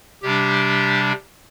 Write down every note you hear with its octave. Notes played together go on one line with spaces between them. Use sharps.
C3 G3 D4 G4